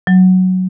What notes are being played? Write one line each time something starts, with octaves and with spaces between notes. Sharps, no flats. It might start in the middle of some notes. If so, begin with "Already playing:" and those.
F#3